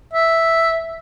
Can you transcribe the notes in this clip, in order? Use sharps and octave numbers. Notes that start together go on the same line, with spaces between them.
E5